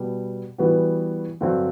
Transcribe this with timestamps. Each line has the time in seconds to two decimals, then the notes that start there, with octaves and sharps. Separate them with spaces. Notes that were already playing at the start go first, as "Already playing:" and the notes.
Already playing: B2 G3 B3
0.58 E3 G3 B3 F#4
1.41 G2 D3 F#3 C4